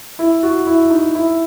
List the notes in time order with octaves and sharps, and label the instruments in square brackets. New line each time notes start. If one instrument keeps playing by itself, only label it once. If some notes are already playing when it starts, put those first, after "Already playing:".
[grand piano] E4
F#4
E4
D#4
E4